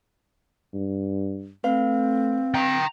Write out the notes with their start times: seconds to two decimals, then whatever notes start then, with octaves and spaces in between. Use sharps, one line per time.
0.74 G2
1.64 A3 C4 B4 F5
2.55 G5 A#5